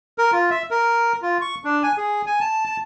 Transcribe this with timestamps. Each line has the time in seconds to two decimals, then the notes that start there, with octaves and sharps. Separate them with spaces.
0.18 A#4
0.32 F4
0.50 E5
0.71 A#4
1.22 F4
1.41 C#6
1.64 D4
1.83 G#5
1.97 G#4
2.26 G#5
2.40 A5
2.65 A5